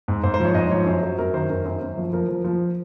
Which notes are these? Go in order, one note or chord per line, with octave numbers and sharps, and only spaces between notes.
G#2
G#2 C5
C5
F3 C#5
G#2 D#5
F3 C#5
F#2 C5
F#3 C5
F#2 A#4
D#3 C5
F#2 A#4
F#2 C5
F#2
F3
F3 A#4
F3
F3